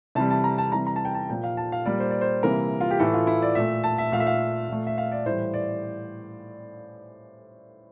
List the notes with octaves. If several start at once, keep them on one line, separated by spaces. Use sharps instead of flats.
C3 E3 G3 A5
A5
A#5
A5
C3 E3 G3 A#5
A#5
A5
G5
A5
A#2 F3 A#3 G5
F5
A5
F5
A#2 G3 A#3 D5
C5
D5
C5
C3 E3 G3 A#3 A#4
F4
G4
A2 E3 A3 A4
F4
E4
D5
A#2 A3 E5
A5
E5
A#2 A3 F5
E5
F5
A#2 A3
E5
F5
D5
A2 E3 G3 C5
D5